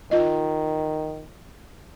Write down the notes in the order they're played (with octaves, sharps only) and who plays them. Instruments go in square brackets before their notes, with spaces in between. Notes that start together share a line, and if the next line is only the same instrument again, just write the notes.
[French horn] D#3 [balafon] F4 D#5